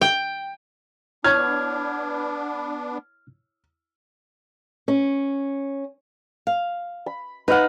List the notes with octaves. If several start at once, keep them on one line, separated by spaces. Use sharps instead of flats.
G5
B3 D4 E4 C#5 C#6 F6 G#6
C#4
F5
B5
D#4 B4 F5 F#5